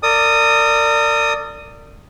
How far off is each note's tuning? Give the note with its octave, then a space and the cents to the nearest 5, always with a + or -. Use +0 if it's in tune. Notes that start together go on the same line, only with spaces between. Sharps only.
A#4 -40 D5 +0 D#6 +0